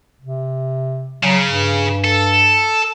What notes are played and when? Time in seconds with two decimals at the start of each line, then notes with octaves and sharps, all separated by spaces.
0.21 C3
1.23 C#3 F#3
1.46 G2
2.04 A4